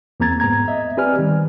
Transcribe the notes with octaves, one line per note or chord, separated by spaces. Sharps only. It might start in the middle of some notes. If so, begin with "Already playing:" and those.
E2 A#3 C4 A#5 G#6 A6
G#2 B3 A#5 G#6
D#5 E5
C4 G4 B4 D5 G#5 F6
D#3 G3